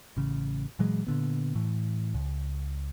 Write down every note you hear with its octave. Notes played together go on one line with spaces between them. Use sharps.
A1 C#3
A#2 E3 F#3 G#3
A#2 D3 B3
A2 E3
C#2